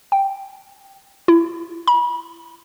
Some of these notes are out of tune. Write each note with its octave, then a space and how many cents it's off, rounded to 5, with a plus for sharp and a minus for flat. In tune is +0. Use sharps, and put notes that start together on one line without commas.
G5 +0
E4 +35
B5 -30